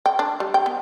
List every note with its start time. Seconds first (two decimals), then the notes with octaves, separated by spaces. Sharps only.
0.06 G5
0.19 D4
0.40 G3
0.54 G5
0.66 B3